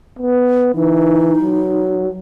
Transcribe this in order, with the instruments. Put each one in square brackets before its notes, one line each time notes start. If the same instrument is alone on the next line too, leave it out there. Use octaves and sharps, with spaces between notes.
[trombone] B3
[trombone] E3 [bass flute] D#4
[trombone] F#3